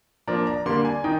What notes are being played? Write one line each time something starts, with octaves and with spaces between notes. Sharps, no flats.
F3 A#3 D4 A#5
A#5
D3 G3 A#3 D4 C6
G#5
D#3 D#4 G5